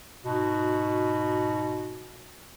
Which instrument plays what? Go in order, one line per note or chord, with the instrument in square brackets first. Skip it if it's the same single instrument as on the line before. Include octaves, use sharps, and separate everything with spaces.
[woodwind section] G#2 B2 F#4